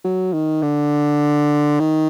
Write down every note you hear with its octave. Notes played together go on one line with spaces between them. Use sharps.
F#3
D#3
D3
D#3